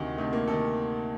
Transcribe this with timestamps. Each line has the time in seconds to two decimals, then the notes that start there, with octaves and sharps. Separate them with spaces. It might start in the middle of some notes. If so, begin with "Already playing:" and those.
Already playing: D2 C3 D#3
0.18 D2 C3 D#3 A3
0.33 A#3
0.48 C3 D#3 A4